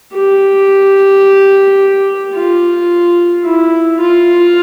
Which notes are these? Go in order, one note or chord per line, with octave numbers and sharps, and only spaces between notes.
G4
F4
E4
F4